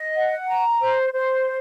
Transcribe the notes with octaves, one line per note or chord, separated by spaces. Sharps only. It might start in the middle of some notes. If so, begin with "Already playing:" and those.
Already playing: D#5
F#5
A#5
C5
C5